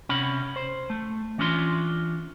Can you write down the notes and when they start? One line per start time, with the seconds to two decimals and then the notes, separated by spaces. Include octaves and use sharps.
0.09 C3 C#4 F#5 B5
0.56 C5
0.90 A3
1.38 E3 C#4 D4 F4 C6